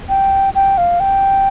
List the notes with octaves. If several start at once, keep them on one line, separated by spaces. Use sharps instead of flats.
G5
G5
F5
G5